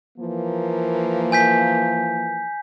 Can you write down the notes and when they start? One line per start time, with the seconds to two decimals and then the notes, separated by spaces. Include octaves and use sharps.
0.18 E3 F3 A#3
1.32 G#5 G6 B6